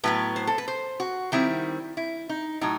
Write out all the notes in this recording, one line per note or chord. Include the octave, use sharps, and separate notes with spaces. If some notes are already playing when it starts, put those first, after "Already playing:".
A2 F#3 B3 B4
C5
A4
B4
C5
F#4
D#3 G3 C4 E4
E4
D#4
A2 F#3 D#4